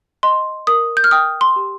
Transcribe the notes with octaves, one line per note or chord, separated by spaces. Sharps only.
D#5 C6
A#4 D#6
G6
F6
G5 D#6
C6
G4